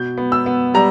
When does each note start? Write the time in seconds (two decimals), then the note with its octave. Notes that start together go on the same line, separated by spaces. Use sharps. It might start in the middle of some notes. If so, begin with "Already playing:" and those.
Already playing: B2 G6
0.18 B3
0.32 E6
0.46 B3
0.74 G3 A#5